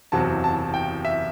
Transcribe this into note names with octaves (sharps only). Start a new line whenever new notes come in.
F#1 E2 C3 F#3 A5
A5
G5
E5